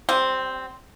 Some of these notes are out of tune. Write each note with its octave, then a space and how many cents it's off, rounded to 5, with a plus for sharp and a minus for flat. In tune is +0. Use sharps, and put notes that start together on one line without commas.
G3 -25 C4 +0